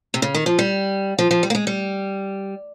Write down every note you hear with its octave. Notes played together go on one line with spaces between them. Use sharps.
C3
C#3
D#3
F3
G3
F3
F3
G3
A#3
G#3
G3